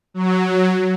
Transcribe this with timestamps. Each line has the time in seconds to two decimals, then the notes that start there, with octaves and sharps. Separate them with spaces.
0.14 F#3